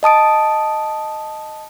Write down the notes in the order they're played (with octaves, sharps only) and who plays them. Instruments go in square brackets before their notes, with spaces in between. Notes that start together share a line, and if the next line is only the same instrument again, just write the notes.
[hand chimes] D#5 A5 D#6 D7